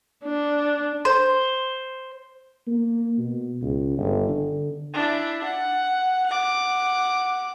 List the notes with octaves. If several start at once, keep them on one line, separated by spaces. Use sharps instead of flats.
D4
C5
A#3
B2
C#2
G1
D3
D4 E4
F#5
F#5 D6